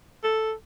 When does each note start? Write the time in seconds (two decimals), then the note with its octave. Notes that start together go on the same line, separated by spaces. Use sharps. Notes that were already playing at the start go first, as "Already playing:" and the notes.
0.24 A4